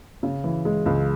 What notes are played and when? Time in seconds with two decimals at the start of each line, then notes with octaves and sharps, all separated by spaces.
0.23 C#3
0.44 E3
0.65 G#3
0.86 C#2